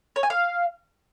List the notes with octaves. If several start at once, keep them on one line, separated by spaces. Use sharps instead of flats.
C#5
G#5
F5